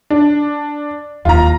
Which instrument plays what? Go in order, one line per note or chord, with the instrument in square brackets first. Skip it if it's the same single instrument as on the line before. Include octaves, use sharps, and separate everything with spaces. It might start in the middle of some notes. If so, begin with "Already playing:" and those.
[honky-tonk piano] D4
[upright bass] D#2 E4 [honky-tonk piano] F4 A#5